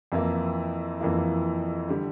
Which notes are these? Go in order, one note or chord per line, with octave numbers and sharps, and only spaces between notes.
F2 E3 A#3 E4
F2 E3 A#3 E4
D3 G3